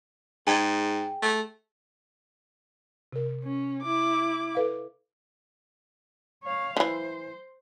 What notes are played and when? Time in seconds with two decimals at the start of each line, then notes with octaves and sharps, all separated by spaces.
0.47 G#2 G#4 G5
1.22 A3
3.13 C3 A#4
3.44 C#4
3.82 E4 D6
4.55 A4 B4 F5
6.43 C#5 F5
6.77 D3 E3 C5